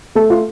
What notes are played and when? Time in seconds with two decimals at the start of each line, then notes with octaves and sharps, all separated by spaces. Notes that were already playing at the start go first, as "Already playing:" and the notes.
0.15 A3 A4
0.30 F4